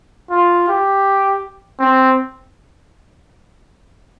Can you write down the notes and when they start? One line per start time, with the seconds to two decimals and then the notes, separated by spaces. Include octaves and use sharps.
0.30 F4
0.68 G4
1.80 C4